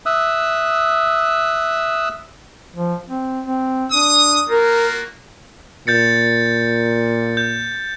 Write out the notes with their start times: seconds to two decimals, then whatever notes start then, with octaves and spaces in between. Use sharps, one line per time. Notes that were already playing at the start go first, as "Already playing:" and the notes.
0.06 E5 D#6 E6 F#6
2.76 F3
3.08 C4
3.46 C4
3.92 D4 D#6
4.49 A#3 F4 F#4 A#4
5.87 A#2 G6 A6 C#7
7.37 G6